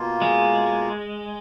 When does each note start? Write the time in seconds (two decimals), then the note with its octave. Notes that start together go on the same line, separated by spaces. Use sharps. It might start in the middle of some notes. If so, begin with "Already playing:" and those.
Already playing: B2 A#3 F4
0.22 G#3